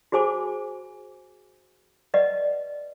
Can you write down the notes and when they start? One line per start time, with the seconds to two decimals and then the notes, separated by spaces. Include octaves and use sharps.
0.12 F#4 G#4 C5 G#5 D6
2.14 B4 D5 D#5 F#5